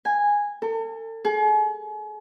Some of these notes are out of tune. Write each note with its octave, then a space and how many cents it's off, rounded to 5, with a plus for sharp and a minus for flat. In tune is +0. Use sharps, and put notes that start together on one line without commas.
G#5 -10
A4 +40
G#4 +40